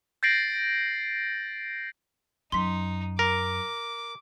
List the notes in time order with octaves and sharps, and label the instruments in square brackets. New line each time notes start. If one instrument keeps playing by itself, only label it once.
[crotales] G6 A6 A#6 C7 D7 F#7
[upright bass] F#2 [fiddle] D#4 [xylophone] C6 B6
[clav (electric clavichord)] A#4 [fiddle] D6